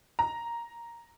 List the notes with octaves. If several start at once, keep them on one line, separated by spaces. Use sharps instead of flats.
A#5